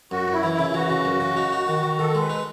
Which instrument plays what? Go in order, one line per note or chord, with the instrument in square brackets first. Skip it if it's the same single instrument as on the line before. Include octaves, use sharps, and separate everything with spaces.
[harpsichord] F#2 [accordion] F#4
[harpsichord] F#2 [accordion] E4
[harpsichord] E3
[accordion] E4
[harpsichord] C#3
[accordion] E4
[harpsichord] E3 [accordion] F#4
[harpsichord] C#3
F#2
C#3
D#4
D#4
D#3
D#3
[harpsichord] D#3 [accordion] A4
[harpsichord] G#3
[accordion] B4
[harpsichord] D#4